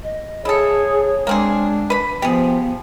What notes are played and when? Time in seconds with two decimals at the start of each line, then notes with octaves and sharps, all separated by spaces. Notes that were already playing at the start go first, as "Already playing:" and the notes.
0.03 D#5
0.45 E4 G#4 A4 C#5
1.27 G#3 A#3 C4 D4 G#4
1.90 B4 B5
2.22 F3 B3 G4 G#4